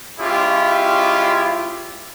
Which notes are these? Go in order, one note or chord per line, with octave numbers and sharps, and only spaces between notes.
G#3 C#4 E4 F4 G4